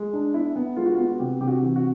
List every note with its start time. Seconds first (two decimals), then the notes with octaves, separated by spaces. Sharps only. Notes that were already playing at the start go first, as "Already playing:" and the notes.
Already playing: G#3
0.13 D4
0.34 B3 E4
0.56 B3
0.76 G#3 F4
0.86 F#4
0.95 F4
0.98 B3
1.10 F#4
1.20 C3 G4
1.40 C3 G4
1.48 F#4
1.62 E3
1.76 F#4